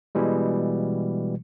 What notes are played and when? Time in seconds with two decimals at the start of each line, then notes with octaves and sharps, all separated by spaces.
0.15 B2 E3 G3 G#3